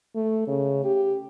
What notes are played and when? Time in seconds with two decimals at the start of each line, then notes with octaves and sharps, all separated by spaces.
0.15 A3
0.47 C#3
0.84 G4